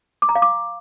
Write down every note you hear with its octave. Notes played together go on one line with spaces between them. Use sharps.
D6
A#5
F5
D6